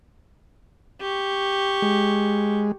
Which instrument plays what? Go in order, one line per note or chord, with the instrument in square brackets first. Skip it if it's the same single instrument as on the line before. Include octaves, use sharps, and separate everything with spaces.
[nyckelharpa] G4 C#6
[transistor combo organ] G#3